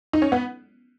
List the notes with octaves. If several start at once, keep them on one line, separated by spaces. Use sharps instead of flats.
D#4
C#4
B3